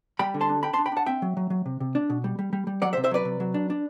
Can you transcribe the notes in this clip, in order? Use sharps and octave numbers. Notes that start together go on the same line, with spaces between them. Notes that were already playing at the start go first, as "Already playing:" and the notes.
G3 G5 B5
D3
A5 C6
D4
D4 G5 B5
A5 C6
D4
G5 B5
D4 F#5 A5
C4 E5 G5
F#3
F#3
F#3
C3
C3
D4
B2
G3
G3
G3
G3
F#3 D5 F#5
C5 E5
C3
C5 E5
F#3 B4 D5
C3
F#3
D4
D4